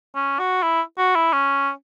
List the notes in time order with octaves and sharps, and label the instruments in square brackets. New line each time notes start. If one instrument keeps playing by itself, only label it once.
[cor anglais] C#4
F#4
E4
F#4
E4
C#4